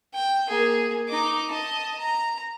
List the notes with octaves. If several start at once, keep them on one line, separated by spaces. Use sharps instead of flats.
G5
A#3 G#4
D#4 D6
D#5 A5
A#5